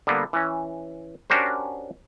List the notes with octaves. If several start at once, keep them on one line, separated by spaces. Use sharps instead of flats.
D3 G3 A#3 B3
E3 C#4
C#4 D4 F#4 G4 A#4 C5